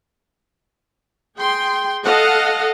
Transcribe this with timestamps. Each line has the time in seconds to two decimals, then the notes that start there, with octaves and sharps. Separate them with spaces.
1.39 G#4 G5 C6
2.05 A4 D#5 F5 F#5